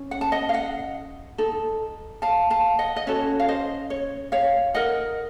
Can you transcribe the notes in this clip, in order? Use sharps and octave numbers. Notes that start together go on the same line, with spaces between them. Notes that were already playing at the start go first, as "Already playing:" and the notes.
Already playing: C#4
F#5
A5
D#5 F#5
F5
D#5 F#5
D#4 A4
F5 A5
F5 A5
D#5 F#5
D#5
C#4 F#4 A4 C#5
F5
C5 D#5
C#5
C#5 F5
D#4 A#4 D#5 F#5